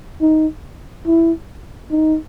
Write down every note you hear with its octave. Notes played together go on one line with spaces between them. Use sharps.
D#4
E4
D#4